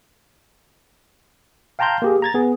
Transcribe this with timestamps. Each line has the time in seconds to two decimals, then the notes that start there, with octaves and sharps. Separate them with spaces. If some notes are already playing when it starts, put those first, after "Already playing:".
1.79 F5 G5 A5 A#5 C6 G6
2.02 A#3 G4 G#4
2.22 A#5 G#6 A6
2.34 B3 G#4